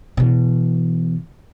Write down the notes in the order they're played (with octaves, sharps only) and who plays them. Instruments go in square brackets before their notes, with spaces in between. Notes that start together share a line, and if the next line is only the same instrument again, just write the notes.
[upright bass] B2 E3